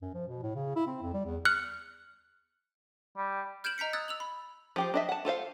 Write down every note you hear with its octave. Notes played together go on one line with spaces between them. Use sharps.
F#2
F3
B2
A2
C#3
E4
C4
F2
G3
E2
F6 F#6 C#7
G3
F6 G6 G#6 D7 E7 F#7
D#5 A#5 G6 B6 C#7
D#6 E6 F#6 G#6 A6
E6 F7 F#7
B5
F3 G4 C5
D4 D#5 E5
F#5 A5
F4 A4 C5 F5